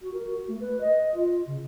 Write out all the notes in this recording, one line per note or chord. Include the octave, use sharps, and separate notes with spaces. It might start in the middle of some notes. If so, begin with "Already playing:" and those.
F#4
A#4
F#4
A3
B4
D#5
F4
C#3